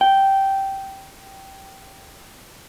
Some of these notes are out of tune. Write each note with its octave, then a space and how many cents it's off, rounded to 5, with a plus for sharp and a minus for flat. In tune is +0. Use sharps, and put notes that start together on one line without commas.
G5 -10